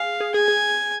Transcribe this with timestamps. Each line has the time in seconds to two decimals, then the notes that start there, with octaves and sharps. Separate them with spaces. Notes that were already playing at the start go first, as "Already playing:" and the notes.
Already playing: G#4 F5
0.20 G#4
0.34 G#4 G#5
0.48 G#4